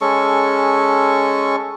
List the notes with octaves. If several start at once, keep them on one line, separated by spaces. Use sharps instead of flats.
G#3 C#4 A4 C#6